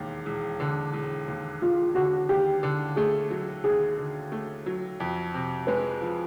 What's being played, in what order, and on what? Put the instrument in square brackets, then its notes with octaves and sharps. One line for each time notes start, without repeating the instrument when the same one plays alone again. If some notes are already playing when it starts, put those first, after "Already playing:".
Already playing: [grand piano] E1 D#2
E1
D3
E1
D#2
[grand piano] E1 [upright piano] F4
[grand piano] D3 [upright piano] F#4
[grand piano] D#2 [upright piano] G4
[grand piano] D3
[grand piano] A3 [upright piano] G#4
[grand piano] F#3
[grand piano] D#2 [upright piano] G#4
[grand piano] D3
A3
F#3
F2
C3
[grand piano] G#3 [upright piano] B4
[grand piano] F3